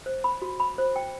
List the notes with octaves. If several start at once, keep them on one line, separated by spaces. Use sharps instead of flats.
C5
B5
F#4
B5
C5
G5